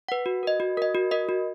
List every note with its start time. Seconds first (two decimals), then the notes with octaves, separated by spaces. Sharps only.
0.09 B4 F#5
0.26 F#4
0.43 A#4 D#5
0.60 F#4
0.77 A#4 D#5
0.95 F#4
1.11 A#4 D#5
1.29 F#4